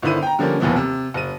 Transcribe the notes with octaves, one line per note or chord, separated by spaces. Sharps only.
G1 D3 D#3 E4 C5 D#7
G5 A#5
D3 F3 G3 A#3 C#4
F1 D#2 E3 F3 B3
C3
F#1 D#7